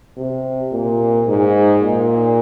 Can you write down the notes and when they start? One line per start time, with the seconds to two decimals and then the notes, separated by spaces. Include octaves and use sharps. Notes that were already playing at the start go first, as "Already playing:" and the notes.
0.18 C3
0.72 A#2
1.27 G#2
1.82 A#2